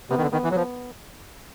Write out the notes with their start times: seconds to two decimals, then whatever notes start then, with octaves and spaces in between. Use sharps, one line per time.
0.10 C3 B3
0.18 D#3
0.22 D3
0.33 D#3 B3
0.44 E3
0.51 F#3
0.56 F3 B3